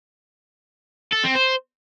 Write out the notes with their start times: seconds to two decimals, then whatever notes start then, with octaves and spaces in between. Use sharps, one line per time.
1.13 A4
1.24 C4
1.35 C5